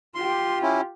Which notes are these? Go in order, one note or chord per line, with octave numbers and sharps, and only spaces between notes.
F4 G4 C6
C#4 E4